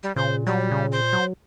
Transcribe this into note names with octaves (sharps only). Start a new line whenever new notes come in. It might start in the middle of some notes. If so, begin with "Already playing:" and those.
G3
A#2 C#3 C5
F#3 G3
C#3
C5
F#3